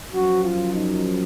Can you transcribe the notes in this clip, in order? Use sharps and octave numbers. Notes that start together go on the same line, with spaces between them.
F#2 F3 F#4
F4
D#4